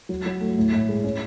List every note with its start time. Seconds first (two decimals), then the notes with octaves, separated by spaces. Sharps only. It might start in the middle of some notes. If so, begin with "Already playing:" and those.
0.09 F#3
0.26 F#3
0.41 A3
0.57 A2
0.73 A2
0.89 G#3
1.04 C#4